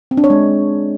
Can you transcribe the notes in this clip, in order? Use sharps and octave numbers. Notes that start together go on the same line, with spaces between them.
C4
D4
C#5
G#3